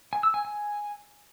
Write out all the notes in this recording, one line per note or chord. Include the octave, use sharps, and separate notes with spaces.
G#5
E6
G#5
G#5